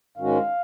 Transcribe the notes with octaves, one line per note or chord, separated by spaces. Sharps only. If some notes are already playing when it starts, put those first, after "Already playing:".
G#2 D#3 G#3 C#4 F#4 F5